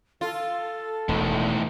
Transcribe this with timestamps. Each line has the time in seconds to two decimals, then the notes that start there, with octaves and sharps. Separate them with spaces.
0.21 F4 A4
1.09 E1 A2 D#3